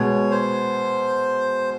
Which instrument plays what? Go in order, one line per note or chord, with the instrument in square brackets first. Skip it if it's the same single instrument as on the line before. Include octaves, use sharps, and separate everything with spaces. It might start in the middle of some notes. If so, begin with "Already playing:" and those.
Already playing: [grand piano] B2 G#3 B3 [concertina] C#5
[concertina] C5